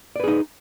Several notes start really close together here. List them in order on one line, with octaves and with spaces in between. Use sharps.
D5 B4 G#4 D#4